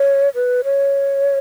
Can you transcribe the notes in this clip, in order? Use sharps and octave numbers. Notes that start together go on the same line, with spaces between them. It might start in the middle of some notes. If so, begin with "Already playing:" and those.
Already playing: C#5
B4
C#5